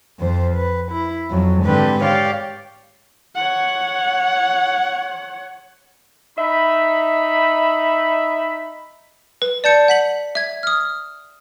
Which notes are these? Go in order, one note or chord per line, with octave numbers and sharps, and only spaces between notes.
F2 C5
B4
E4
F2 F#3
G#2 D3 C4 G4 B4
G4 C#5 D5 F5
C#5 F#5
D#4 E5 B5
B4
D5 A5 G6 C#7
F#5 B6 F#7
E5 G#6
D#6 F6